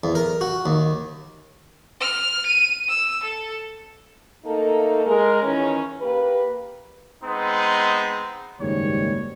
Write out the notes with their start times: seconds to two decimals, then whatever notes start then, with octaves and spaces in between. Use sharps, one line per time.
0.04 E2
0.15 A#4
0.41 F#4
0.66 D#2
2.01 F6
2.46 D#7
2.89 E6
3.23 A4
4.45 A3 A#3 D#4 A4
5.05 G#3 A#4
5.42 D#3 E3 C#4
6.01 A#3 G4 B4
7.24 G#3 B3 C4 D#4
8.60 F#1 D#2 G#2 G3 C#5